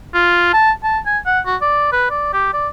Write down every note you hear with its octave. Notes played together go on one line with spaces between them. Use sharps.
F4
A5
A5
G#5
F#5
F#4
D5
B4
D5
G4
D5